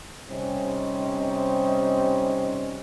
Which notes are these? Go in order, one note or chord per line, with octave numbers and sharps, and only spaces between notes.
C3 G3 C4 C#4 D#4